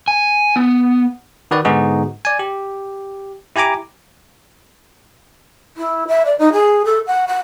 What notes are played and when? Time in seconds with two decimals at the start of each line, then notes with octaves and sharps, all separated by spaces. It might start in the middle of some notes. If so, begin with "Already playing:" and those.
0.08 G#5
0.56 B3
1.51 D#3 F#4 B4 D5
1.65 G#2 D3 B3 D#4 F#4 G#4
2.25 D5 G#5
2.39 G4
3.56 E4 G4 G#5 A#5 D6
5.77 E4
6.08 E5
6.25 D5
6.39 D#4
6.52 G#4
6.85 A4
7.07 F#5
7.27 F#5